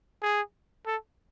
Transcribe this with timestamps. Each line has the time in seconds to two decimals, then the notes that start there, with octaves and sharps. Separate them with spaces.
0.22 G#4
0.87 A4